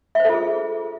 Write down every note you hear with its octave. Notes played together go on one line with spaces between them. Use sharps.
F4 G#4 A4 C5 E5